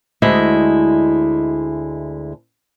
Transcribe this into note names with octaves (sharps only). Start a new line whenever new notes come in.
D2 G#3 E4 F#4 D#5 E5